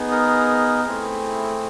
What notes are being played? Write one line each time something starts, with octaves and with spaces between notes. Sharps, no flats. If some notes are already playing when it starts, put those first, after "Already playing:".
Already playing: B3 D#4 G#4
A#4
A3 C4 E4 G#4